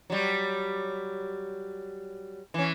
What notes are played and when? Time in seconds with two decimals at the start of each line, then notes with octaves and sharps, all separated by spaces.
0.10 F#3 G3
2.54 E3 C#4